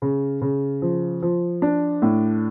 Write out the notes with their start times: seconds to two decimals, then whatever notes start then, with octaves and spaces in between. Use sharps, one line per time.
0.02 C#3
0.41 C#3
0.82 F3
1.22 F3
1.62 D4
2.02 A2